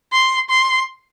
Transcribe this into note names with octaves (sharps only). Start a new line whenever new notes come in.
C6
C6